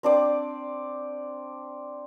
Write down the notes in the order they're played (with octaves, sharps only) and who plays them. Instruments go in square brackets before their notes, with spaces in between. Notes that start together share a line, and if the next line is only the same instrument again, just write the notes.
[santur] C4 D4 C5 D5